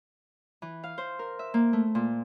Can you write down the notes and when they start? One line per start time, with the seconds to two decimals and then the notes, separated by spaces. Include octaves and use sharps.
0.62 E3
0.83 F5
0.98 C5
1.19 A#4
1.39 E5
1.54 A#3
1.73 A3
1.95 A#2